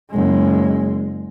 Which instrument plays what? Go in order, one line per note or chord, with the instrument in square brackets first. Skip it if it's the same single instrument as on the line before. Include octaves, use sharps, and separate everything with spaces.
[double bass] F#1 G#3